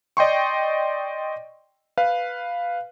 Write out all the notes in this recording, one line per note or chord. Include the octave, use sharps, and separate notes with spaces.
D5 D#5 G5 C6 C#6
B4 F5